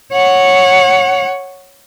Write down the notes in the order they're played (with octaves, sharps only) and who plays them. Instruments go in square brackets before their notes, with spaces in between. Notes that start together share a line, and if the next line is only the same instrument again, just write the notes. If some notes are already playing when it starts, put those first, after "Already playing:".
[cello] C#5 F#5